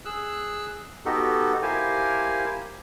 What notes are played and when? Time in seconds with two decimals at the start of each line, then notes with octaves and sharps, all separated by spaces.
0.05 G#4 E6 F#6
1.06 B3 D#4 F#4 G4 A4
1.62 E4 G4 A#4 C5 F5 G#5